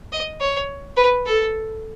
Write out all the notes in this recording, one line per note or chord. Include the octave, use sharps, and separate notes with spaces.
D#5
C#5
B4
A4